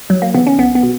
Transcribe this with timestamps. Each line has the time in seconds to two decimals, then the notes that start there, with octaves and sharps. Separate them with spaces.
0.09 C#2 F#3
0.22 A#3
0.34 C#3 E3 B3
0.47 C#4
0.58 B1 B3
0.75 B3
0.83 B2